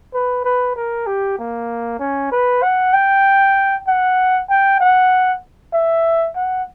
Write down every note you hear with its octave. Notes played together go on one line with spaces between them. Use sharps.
B4
B4
A#4
G4
A#3
C#4
B4
F#5
G5
F#5
G5
F#5
E5
F#5